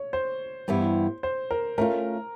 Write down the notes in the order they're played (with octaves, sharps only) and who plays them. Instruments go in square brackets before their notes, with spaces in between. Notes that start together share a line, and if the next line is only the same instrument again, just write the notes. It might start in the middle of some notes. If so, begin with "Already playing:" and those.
Already playing: [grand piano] C#5
C5
[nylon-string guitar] G2 E3 G3 B3 E4
[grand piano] C5
A#4
[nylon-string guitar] A3 C#4 F4 [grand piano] A#4